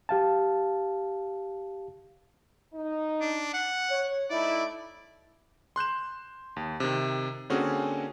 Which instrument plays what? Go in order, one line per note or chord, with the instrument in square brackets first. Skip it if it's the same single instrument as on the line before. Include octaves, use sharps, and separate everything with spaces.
[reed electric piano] G4 F5 A5
[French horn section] D#4
[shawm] D4
F#5
[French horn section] C#5
[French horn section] A3 D#4 E4 [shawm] D5
[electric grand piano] C6 F#6 G6 E7
D#2
C3 D#3
D3 A#3 C4 C#4 F#4 G#4